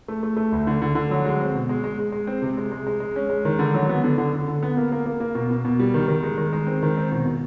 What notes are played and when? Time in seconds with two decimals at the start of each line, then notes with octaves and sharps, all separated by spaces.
0.08 A3
0.23 A3
0.37 A3
0.52 D2
0.67 D3
0.82 D3
0.95 D3
1.11 F#3
1.25 G#3
1.40 C4
1.55 B2
1.69 G#3
1.84 G#3
1.99 G#3
2.12 G#3
2.27 C4
2.42 C3
2.57 G#3
2.72 G#3
2.87 G#3
3.00 G#3
3.16 C#4
3.30 G#3
3.45 D#3
3.59 D3
3.74 F#3
3.89 B3
4.04 D3
4.18 D3
4.33 D3
4.48 D3
4.63 B3
4.77 A#3
4.92 A#3
5.06 A#3
5.20 A#3
5.35 B2
5.51 B2
5.65 B2
5.80 G3
5.94 D#3
6.08 D#3
6.23 G#3
6.38 D#3
6.53 G#3
6.67 C4
6.83 D#3
6.97 C4
7.12 B2
7.25 B2